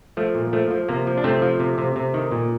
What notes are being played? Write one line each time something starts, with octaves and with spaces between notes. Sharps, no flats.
F3 A3
A#2
F3 A3
F3
C3 A#3
F3
D4
C3 A3 C4
F3
C3
C3
C3
D#3
A#2